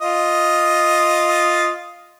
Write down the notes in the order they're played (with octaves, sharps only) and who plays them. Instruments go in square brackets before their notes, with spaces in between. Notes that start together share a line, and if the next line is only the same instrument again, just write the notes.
[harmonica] F4 D#5